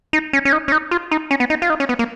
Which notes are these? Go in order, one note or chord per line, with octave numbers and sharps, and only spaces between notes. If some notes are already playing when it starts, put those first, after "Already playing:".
D#4
C#4
C#4
D#4
C#4
D#4
F4
D#4
C#4
B3
D#4
F4
D#4
C#4
B3
A#3